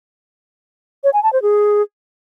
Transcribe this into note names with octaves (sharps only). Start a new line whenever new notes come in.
C#5
G#5
A5
C5
G#4